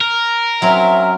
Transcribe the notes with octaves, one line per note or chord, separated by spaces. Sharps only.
A#4
F#3 C4 C#4 E5